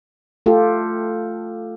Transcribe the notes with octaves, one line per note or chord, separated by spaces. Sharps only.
A3 F4 G4 A4